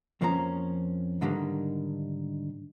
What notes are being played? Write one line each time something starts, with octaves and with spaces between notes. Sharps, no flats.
F2 F3 A#3 C#4 A#5
G#2 D3 D#3 G3 G#3 A#3